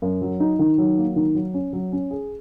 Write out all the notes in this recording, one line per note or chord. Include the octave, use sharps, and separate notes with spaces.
F#2
F#3
D#4
D#3
F#3
A#3
D#3
F#3
C#4
F#3
C#4
G#4